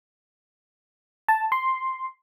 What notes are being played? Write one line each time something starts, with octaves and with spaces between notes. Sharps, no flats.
A5
C6